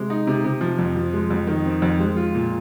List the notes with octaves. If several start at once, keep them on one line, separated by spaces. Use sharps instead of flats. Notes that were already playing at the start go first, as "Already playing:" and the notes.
Already playing: C3 G#3
D#4
C3
C3
F3
F2
F3
G#3
F2
D#3
C4
F2
G#3
F4
A#2